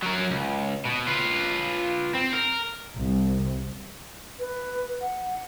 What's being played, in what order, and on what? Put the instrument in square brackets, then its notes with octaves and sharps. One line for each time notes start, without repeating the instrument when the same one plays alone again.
[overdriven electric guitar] F#3 A#4
C#2
B2
F4 B4
C4
A#4
[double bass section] C2
[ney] B4
F#5